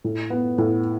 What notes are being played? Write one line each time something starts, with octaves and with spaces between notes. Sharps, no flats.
A2
B3
A2